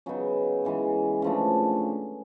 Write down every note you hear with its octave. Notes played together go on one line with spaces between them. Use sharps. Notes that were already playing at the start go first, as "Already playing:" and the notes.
C#3 F#3 B3 D#4
C#3 E3 G#3
C#3 F3 A3 D4